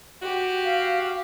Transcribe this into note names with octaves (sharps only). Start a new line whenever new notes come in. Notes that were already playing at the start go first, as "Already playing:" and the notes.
F#4 G4
F5